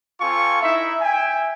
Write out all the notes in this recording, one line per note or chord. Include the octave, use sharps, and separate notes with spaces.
C4 F4 A4 F5 G#5 C#6
D#4 E4 E5
E5 G5 G#5